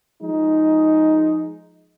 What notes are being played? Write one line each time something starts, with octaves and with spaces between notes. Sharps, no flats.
F3 G#3 D#4